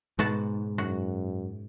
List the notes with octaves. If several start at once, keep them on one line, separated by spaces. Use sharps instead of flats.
G#2 B2 F#4 A5
F#2 F#4